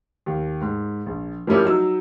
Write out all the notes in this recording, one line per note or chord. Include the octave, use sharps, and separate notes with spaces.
D#2
G#2
A#1
F3 G3 A#3 C#4 E4 G4
F#3 D#4 E6